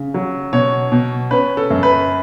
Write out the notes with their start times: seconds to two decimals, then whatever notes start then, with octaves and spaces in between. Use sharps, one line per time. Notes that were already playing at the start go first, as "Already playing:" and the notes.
Already playing: C#3
0.14 F#3
0.53 B2 C#5
0.92 B2
1.31 C#4 B4
1.57 A4
1.70 F#2
1.83 B4